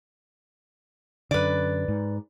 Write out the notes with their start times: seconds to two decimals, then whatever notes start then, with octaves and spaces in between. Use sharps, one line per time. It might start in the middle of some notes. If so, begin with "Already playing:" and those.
1.31 F#2 D3 B4 D5
1.88 G#2